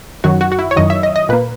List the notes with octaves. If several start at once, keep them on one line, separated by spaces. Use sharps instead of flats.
F#2 D#3 F#3 F#4
F#4
F#4
E4
C#5
F#2 D#3 F#3 D#5
E5
D#5
D#5
A#2 A#3 B4